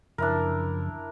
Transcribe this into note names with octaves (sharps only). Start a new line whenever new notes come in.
F#2 C#3 F3 D4 E4 A#4